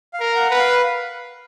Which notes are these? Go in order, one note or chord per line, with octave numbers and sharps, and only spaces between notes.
F5
A#4
F#5
B4
F5